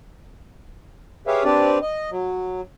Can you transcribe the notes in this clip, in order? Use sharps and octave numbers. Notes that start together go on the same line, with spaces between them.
G4 G#4 B4 C#5 E5 F5
C4 D4 G4 B4 D5
D#5
F#3